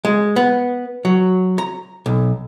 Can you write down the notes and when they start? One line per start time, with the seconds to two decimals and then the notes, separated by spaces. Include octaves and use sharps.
0.05 G#3
0.36 B3
1.05 F#3
1.58 A#5
2.06 B1